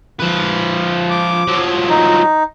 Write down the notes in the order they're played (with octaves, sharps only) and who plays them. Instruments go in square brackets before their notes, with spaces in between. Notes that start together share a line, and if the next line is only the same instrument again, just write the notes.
[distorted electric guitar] F3 B4
[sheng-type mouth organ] D6
[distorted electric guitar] F3 F#3
[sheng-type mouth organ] D#4